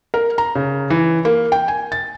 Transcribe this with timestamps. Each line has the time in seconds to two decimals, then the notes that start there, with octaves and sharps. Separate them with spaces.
0.14 A#4
0.38 A#5
0.55 C#3
0.90 E3
1.25 A#3
1.52 G5
1.68 G#5
1.92 A6